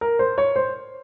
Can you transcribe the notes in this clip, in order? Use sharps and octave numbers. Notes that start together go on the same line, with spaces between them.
A#4
C5
C#5
C5